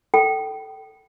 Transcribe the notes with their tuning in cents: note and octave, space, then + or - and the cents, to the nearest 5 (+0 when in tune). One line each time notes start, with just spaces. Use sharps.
A4 +0 G5 -25